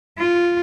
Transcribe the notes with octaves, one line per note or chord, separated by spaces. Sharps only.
F4